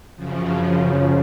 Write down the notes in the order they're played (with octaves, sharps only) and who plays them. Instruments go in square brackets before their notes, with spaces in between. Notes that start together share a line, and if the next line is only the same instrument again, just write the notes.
[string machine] F#2 C#3 F3